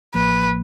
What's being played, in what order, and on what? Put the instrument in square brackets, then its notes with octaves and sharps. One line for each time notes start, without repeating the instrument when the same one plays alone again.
[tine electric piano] A1 A2 F3 A#3 [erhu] B4